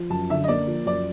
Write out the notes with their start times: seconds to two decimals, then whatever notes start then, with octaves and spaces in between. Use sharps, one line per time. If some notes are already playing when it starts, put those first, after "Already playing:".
Already playing: F3
0.10 F#2 A5
0.30 D3 E5
0.44 D#5
0.48 A#3 D5
0.67 F3
0.86 F#2 D5